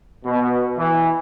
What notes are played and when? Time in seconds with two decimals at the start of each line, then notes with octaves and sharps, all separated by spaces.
0.24 B2
0.77 E3